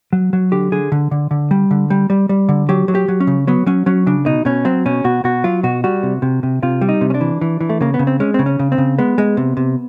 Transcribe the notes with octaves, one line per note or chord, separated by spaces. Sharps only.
F#3
F#3
D3 G4
D3 G#4
D3
D3
D3
G3
D3
G3
G3
G3
D3
F#3 G4
F#3
G4
F#3
C#4
C#3
F#3 B3
F#3 C#4
F#3 C#4
C#3 D4
B2 D#4
B2 C#4
F#3 C4
B2 C#4
B2 F#4
B2 F#4
F#3 F4
B2 F#4
G3 F#4
C3
C3
C3
C3 F4
G3
D#4
C3
C#4
D4
E3
E3
E3
A3
C#3 A#3
B3
C#3
C4
G#3 C#4
C#3 C4
C#4
C#3
C4
C#3
G#3 B3
G#3
C3
C3